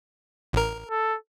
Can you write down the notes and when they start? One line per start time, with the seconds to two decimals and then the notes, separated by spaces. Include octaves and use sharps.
0.53 A1 A#4
0.89 A4